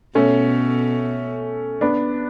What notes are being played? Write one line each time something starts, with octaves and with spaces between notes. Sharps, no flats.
B2 A3 C#4
B3 D4